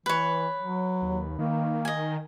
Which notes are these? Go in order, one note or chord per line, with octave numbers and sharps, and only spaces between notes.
E3 B4 C#5
F#3
D#2
D#3 A#3
D#5 G#5